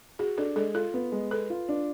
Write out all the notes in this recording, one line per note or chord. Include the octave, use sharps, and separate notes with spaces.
F#4 G#4
D4 A4
G#3 A4
F4 A4
B3
G#3
A4 B4
F4
D4